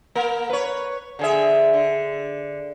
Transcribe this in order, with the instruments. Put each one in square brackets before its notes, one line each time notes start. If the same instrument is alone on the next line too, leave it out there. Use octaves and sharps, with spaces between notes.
[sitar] A#3 A#4
B4 C#5
D3 G#4 E5
D3